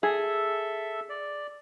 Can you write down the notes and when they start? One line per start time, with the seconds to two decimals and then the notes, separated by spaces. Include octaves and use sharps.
0.03 G#4 A4 E5
1.09 D5